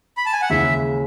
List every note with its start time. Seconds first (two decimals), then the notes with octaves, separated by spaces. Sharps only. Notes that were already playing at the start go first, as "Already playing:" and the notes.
0.17 B5
0.26 A5
0.33 G#5
0.42 F#5
0.50 D#2 C#3 E3 G#3 E5